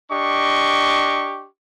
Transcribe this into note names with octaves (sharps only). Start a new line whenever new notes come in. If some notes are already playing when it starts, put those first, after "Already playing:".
D4 G4 D#5 C#6